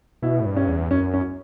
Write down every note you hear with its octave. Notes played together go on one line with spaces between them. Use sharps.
B2 E4
A2
G2
C#4
E2
F#2 C#4
C#4